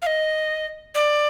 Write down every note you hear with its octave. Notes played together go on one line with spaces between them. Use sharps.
F5
D#5
D5